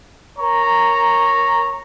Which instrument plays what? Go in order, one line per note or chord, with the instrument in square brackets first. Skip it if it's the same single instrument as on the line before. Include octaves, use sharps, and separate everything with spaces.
[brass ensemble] A#4 A#5 [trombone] C#5